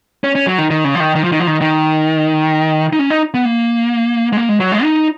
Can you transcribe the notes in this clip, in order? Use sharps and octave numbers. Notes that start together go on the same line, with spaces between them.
C#4
C#4
F#3
D#3
D#3
C#3
F3
D#3
D#3
F3
D#3
F3
D#3
D#3
D#4
C#4
D#4
B3
A#3
G#3
A#3
G#3
F#3
G#3
D#4